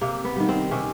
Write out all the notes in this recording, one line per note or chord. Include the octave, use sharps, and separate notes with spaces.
C3 A#3
B3
D#3 G3
C4
C3 C#4